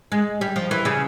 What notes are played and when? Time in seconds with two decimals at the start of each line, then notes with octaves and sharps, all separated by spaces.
0.12 G#3
0.41 G3
0.56 F3
0.71 E3
0.85 C#3